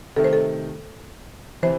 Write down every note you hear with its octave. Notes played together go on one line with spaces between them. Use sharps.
C3 D#3 A3 A4
C5
A4
C3 E3 C5